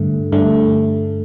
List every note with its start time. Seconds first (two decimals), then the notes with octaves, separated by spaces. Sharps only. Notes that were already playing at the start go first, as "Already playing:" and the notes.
Already playing: G2 D3 A3
0.32 G2 D3 A3